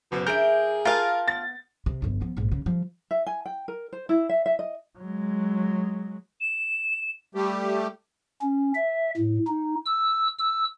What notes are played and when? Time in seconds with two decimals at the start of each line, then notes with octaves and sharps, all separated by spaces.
0.12 F#1 B2
0.27 E3 D4 G#4 A#4 E5 G6 D7
0.85 F4 A#4 F5 G#5 A5
1.28 B3 A6
1.86 C3
2.02 G1 F2
2.21 F3 B3
2.37 A#1 G#2
2.52 C#3
2.66 F3 G3
3.11 E5
3.26 G#5
3.46 G5
3.68 A#4
3.93 C5
4.09 E4
4.29 E5
4.46 E5
4.59 D#5
4.98 F#3 G#3
6.41 E7
7.35 G3 A3 G4
8.42 C#4
8.75 E5
9.17 A2
9.47 D#4
9.85 E6
10.39 E6